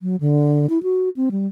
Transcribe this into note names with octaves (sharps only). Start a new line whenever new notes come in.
F#3
D3
E4
F#4
C4
G3